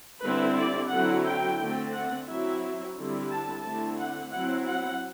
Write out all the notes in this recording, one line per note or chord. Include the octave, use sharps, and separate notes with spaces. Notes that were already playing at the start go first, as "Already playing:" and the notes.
D3 G3 C4 E4 B4
D5
D3 F#3 C4 E4 F#5
G5
D3 A3 C4
F#5
F#3 C4 E4 E5
D3 G3 C4 E4
A5
D3 A3 C4 E4 A5
F#5
F#3 C4 E4 F#5
F#5